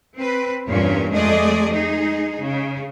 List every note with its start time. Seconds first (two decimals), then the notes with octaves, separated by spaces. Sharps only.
0.18 C4 B4
0.67 E2 G2 A#2 C#4 C#5
1.11 F2 G#3 A3 G#4 D5 D#5
1.69 G#3 D#4 G#4
2.40 C#3